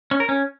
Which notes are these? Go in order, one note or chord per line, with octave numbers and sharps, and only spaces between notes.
C#4
A#4
C#4